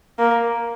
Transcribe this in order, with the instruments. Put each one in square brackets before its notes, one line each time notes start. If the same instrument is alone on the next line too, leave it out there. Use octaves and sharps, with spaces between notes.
[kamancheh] A#3